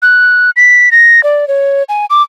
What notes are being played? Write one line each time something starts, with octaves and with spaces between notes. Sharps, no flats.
F#6
B6
A#6
D5
C#5
G#5
D6